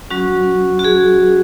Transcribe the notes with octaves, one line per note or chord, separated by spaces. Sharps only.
F#3 C#4 F#4
F#4
G#4